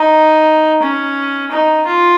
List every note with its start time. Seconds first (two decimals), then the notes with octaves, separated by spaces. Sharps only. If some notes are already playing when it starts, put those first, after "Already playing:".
Already playing: D#4
0.82 C#4
1.52 D#4
1.86 F4